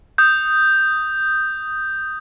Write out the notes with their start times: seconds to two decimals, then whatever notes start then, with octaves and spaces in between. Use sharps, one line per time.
0.18 D#6 G6